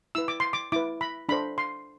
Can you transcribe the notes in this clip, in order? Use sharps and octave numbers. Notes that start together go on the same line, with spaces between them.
E4 B4 E6
D6
C6
D6
E4 B4 D6
B5
D4 A4 C5 B5
C6